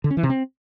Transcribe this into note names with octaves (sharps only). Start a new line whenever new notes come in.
D3
C#4
E3
C3
C4